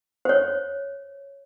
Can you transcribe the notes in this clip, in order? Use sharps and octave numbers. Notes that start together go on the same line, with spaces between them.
C5 C#5